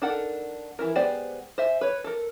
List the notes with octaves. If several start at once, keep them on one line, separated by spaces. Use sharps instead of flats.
D4 D#4 A4 A#4 F#5
E3 E4 A#4
G#3 B3 G4 C5 D5
C5 E5 G#5
B4 C#5
A4 A#4